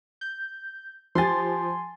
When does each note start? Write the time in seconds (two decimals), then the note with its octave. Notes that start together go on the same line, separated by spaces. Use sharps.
0.21 G6
1.15 F3 G4 G#5 C6 A6